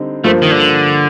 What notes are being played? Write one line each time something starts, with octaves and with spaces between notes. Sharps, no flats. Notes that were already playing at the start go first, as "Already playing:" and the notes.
Already playing: D3 G3 C4 D#4
G2 F3 A3 A#3 F4 C5
D#3
D3